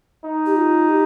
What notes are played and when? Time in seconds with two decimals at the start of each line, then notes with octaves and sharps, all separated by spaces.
0.25 D#4
0.46 G4
0.57 F4
0.89 G4